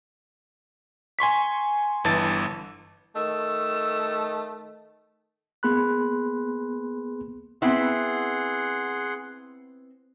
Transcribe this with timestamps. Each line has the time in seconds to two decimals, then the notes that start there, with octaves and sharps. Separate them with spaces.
1.19 G#5 C6 C#6 B6
2.04 G1 E3 A5 A6
3.15 D#3 A3 E6
5.63 A#3 B3 G#4 B5 C6 F#6
7.62 B3 C4 E4 G#4 F#5 C6